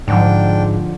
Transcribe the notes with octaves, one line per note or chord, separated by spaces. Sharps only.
G#2 D3 F3 D4 G5